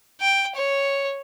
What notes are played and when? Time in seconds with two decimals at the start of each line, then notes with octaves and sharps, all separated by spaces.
0.21 G5
0.56 C#5